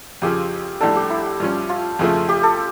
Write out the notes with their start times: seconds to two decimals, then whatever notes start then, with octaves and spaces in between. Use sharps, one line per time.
0.22 F2 C#3 F3 G4
0.81 A#1 A2 G3 D4 A4
0.96 G4
1.10 E4
1.40 G2 F3 C#4
1.69 F4
1.99 F2 C#3 F3 A3
2.29 G4
2.43 A4